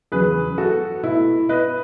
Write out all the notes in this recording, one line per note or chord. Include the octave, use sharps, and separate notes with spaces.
E2 C#3 F#3 B3 G#4 B4
F#4 A4
B2 A3 E4
B4 D#5